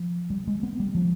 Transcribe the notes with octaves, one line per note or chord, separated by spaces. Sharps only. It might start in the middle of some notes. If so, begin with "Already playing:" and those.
Already playing: F3
G3
G#3
B3
G3
F3